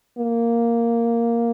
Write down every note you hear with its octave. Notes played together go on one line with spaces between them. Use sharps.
A#3